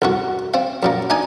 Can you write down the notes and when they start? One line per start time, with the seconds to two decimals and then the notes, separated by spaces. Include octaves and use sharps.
0.02 C2 G2 F#4
0.54 C4 F5
0.83 F#2 A#2 A#3
1.10 D4 D#4 G#5